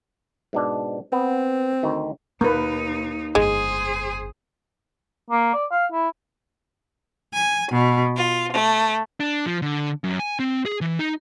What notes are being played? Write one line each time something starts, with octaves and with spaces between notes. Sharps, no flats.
G#2 B2 D4
B3 C4
D2 D#3
D#2 B2 A#3 D#4 B4
G1 F2 G#3 G#4 C5
A#3
D5
F5
E4
G#5
B2
F4
A3
D4
F3
D3
F#2
G#5
C4
G#4
E3
D#4